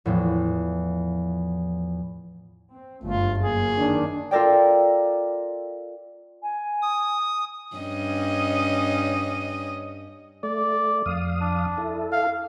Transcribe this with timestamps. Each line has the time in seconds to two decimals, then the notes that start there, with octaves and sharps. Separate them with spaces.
0.06 E2 A2 F3
2.72 C4
3.04 G1 F#2 A3 F4
3.39 F#2 F#3 A#3 G#4
3.77 D#3 D4
4.31 F4 A4 A#4 D5 G5
6.43 G#5
6.82 D#6
7.75 G2 C#4 D#5
10.43 A3 D5
11.06 F2 F5 D#6
11.41 D4
11.78 E4 A4
12.12 F5